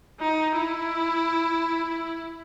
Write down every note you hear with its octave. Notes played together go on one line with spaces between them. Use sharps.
D#4
E4